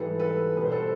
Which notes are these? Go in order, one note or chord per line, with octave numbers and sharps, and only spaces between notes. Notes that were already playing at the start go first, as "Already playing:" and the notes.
Already playing: G#2 E3 G3 A4 B4
A4 B4
B2 G3 B4
C5
A4 B4